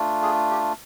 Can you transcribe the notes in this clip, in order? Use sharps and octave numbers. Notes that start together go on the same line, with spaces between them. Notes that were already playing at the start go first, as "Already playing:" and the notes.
Already playing: A3 D4 F4
G#4
G4